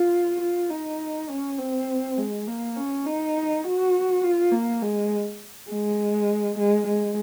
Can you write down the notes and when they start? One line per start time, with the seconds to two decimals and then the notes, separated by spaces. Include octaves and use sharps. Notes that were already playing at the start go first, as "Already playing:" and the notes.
Already playing: F4
0.41 F4
0.70 D#4
1.29 C#4
1.58 C4
2.18 G#3
2.47 A#3
2.76 C#4
3.06 D#4
3.64 F#4
4.23 F4
4.52 A#3
4.82 G#3
5.70 G#3
6.58 G#3
6.87 G#3